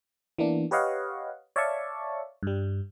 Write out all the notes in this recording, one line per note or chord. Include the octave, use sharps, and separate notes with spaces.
E3 A#3 B3 D4
G4 B4 C#5 D#5 F5 F#5
C#5 D5 E5 F5 A5 C#6
G2 G3